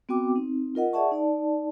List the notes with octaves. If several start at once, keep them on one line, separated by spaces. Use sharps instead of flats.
B3 C4 F#4 G5 D6
C4 D#4
F4 A#4 D#5 F#5
G#4 D5 E5 F#5 A5 C#6
D#4 D5 A5